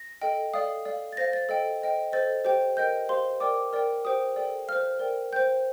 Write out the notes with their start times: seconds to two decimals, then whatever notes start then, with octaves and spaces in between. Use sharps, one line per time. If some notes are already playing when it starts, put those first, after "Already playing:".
Already playing: A#6
0.21 A4 D#5 G5
0.54 A4 D5 F5 D#6
0.85 A4 D5 F5
1.13 A6
1.17 C5 F5 A#6
1.33 A6
1.49 A4 D#5 G5
1.82 C5 D#5 G5
2.12 A4 C5 D#5 A6
2.45 G4 C5 G5
2.77 A#4 D#5 G5 G6
3.09 G4 C5 F5 C6
3.40 A#4 D5 G5 D6
3.73 A#4 D5 G5
4.05 G4 C5 G5 D#6
4.36 A4 D5 G5
4.68 C5 F5 F6
4.99 A#4 D5 G5
5.33 C5 G5 G6